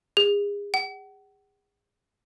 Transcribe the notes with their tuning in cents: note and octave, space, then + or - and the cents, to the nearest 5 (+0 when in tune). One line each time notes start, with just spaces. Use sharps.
G#4 -35
F#5 +40